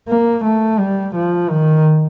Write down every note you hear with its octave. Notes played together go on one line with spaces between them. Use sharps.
A#3
A3
G3
F3
D#3